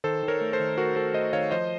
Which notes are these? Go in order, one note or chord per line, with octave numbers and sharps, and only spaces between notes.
D#3 A4 C5
D#3
A#4 C#5
A3
A4 C5
D#3
A3 F#4 A#4
A3 A4 C5
A3 C5 D#5
D#3 C#5 F5
F3 C5 D#5